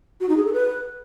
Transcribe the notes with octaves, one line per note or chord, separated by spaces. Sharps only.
F#4
D#4
G#4
A4
B4